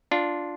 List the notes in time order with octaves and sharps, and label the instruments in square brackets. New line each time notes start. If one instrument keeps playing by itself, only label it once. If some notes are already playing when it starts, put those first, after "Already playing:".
[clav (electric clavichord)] D4 F4